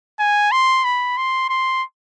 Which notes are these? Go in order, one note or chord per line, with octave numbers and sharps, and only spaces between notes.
G#5
C6
B5
C6
C6